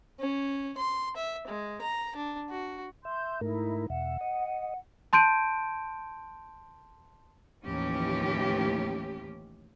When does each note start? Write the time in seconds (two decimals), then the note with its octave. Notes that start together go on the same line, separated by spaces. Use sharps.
0.19 C#4
0.78 C6
1.17 E5
1.48 G#3
1.82 A#5
2.16 D4
2.50 F#4
3.05 E5 C6 G6
3.41 G#2 A3 D#4 E4 A#4
3.90 E2 B2 E5 F#5
4.21 D#5
5.13 A5 C6 G6 D7 D#7
7.64 D#2 A2 E3 F3 C#4 G4